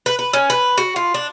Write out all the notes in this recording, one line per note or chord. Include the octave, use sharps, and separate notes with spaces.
B4
B4
C#4
B4
F#4
F4
D4